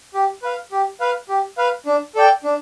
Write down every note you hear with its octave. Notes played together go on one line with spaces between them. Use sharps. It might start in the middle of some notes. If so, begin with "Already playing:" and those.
G4
B4 F5
G4
B4 F5
G4
B4 F5
D4
A4 D5 G5
D4